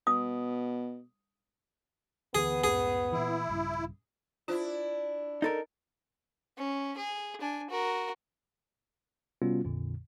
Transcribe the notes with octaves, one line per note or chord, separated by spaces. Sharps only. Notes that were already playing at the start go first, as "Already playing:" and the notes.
B2 D#6
D2 E3 B3 G#4
C#2 F#2 A2 G#4
A#2 E3 E4
A#1 G2 C#3
D4 E4 F4 C5
D#4 A4 A#4
C#4
G#4
D4 G#5
F#4 A#4
C3 G3 B3 C#4 F4 F#4
A#1 F2 A#2 D3